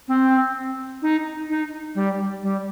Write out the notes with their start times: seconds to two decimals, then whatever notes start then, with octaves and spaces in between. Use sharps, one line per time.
0.08 C4
1.02 D#4
1.49 D#4
1.95 G3
2.43 G3